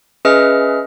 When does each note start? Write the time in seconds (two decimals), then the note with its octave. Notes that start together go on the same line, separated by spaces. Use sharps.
0.25 C#4 G#4 B4 D#5 E5 F6